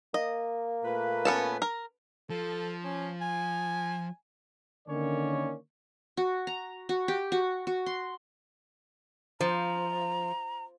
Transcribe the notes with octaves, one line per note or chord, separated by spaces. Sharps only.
A#3 D#5
A#2 A3 B4
B3 C#4 A5
A#4
F3 A4
C#4
G#5
D3 D#3 A#3 C#4 C#5 D5
F#4
A#5
F#4
G4
F#4
F#4
C6
F3 F4 C5 A#5